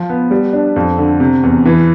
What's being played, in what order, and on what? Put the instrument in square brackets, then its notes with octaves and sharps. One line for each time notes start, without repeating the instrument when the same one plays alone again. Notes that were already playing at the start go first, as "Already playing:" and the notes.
Already playing: [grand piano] F3
B3
G3
D4
F2
D3
C3
E2
E3